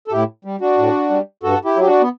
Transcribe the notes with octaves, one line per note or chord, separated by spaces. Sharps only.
A4
A2 E4 G4
G3
D4 F#4
A2
G3
G2 F#4 A4
E4 G4
F#3
G4
D4 F#4
B3